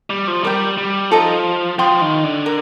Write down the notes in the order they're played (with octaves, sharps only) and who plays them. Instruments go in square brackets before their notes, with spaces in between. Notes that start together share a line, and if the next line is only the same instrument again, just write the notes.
[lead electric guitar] G3
F3
[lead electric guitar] G3 [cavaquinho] A#4 D5 G5
[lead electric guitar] G3
[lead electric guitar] F3 [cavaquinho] D#4 A4 D#5 A#5
[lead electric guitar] F3 [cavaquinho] C5 G5 C6 D#6
[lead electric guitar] D#3
D3
[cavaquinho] A#4